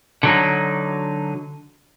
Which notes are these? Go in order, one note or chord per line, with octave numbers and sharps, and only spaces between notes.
D3 F#3 D#4